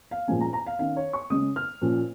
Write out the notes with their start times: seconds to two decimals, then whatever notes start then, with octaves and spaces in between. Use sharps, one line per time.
0.11 F5
0.28 A#2 F3 G#3 C#4 G#5
0.41 A#5
0.53 A#5
0.66 F5
0.79 D#3 C#4 F5
0.97 C#5
1.13 C#6
1.30 C#3 G#3 C#4 D#6
1.56 F6
1.81 A#2 F3 C#4